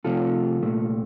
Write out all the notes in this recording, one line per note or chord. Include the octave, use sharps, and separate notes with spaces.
C2 C3 F3 A3 F4 A4
C2 A#2 A3